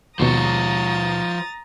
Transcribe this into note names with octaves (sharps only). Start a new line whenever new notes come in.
D#2 B2 F3 C#5 A#5 D#6 A6